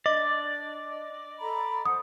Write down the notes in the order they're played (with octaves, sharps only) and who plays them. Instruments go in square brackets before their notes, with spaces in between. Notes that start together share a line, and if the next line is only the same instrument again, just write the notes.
[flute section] D4 [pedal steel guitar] D5 [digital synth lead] D#5
[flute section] A4 A#5 B5
[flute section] C5 F#5 [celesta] D#6